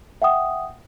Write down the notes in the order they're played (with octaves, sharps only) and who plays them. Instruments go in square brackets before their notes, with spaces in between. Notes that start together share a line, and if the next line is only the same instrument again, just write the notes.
[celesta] E5 F#5 G5 D#6